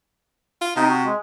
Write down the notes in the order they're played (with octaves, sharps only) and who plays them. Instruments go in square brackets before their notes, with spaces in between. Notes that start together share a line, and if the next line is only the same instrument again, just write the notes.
[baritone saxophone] F4
[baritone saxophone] C3 [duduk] D#4
[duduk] F#4
G#3